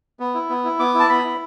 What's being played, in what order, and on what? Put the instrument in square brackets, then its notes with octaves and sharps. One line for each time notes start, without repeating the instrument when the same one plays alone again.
[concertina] B3
E4
B3
E4
B3 D6
E4
A5
B3 B5
E4